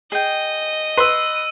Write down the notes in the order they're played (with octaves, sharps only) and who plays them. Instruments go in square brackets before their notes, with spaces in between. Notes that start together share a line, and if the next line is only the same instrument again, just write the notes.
[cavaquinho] G#4 G5 [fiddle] D#5
[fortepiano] B4 B5 C6 [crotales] E6 D#7